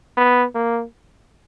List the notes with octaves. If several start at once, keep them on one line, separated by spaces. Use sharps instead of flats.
B3
A#3